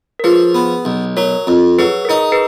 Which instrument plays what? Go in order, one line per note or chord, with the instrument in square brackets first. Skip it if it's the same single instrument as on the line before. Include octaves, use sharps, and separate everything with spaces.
[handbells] A#4
[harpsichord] F3 [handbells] G#4 B4
[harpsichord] B3
B1
[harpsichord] F#3 [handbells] A#4 C#5
[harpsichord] F2
[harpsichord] F#3 [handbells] G#4 B4
[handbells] A#4
[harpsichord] D#4 [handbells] G#4
[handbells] G#4 B4